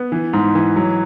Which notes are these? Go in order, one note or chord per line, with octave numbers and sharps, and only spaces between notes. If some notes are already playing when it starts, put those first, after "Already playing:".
Already playing: B3
E3
G#2
E3
F#3